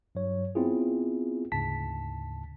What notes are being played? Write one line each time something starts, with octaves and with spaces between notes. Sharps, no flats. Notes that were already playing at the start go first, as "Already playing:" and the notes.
G2 F#3 C#5
B3 C4 E4 F4 G#4
D2 G#2 C#3 A5 B6